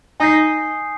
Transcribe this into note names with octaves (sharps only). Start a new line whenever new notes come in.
D#4 G#5 D#6 G6 C7